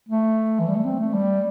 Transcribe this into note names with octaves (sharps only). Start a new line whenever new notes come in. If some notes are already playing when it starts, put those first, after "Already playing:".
A3
E3
G3
A3
C4
A3
G3